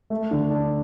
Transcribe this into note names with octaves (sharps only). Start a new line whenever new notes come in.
A3
D3
D4